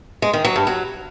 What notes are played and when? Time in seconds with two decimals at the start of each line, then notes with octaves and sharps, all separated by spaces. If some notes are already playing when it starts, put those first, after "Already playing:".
0.22 G#3
0.33 D#3
0.45 F#3
0.56 G2
0.67 F#3